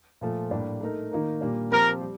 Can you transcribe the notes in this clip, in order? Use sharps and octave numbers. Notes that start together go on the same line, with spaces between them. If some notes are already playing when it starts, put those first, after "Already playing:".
A#2 F3 A3
A2 G3 A#3 D4 G4
A3 D#4 A#4
D#3 A#3 D#4 A#4
A#2 G3 A#3 D4
F3 C4 G4 A#4 C5
G3